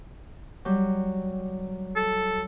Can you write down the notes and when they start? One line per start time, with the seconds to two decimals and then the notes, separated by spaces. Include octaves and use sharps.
0.65 F#3 G3
1.96 A4